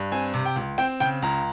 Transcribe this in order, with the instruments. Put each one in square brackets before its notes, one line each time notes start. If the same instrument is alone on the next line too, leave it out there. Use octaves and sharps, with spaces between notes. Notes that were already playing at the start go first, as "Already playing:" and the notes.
Already playing: [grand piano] G2
C4 G#5
C3
G5
C#2
C4 G5
C#3 G5
C#2 A#5